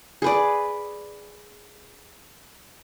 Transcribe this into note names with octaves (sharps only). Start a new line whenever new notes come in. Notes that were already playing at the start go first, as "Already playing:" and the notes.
G#4 B4 D5